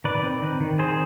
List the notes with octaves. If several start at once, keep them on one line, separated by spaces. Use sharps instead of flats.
D#3 B4 D5
C4
D#3
D#3
C4 G#4 C5